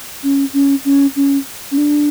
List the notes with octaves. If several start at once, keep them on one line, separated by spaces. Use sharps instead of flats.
C#4
C#4
C#4
C#4
C#4
D4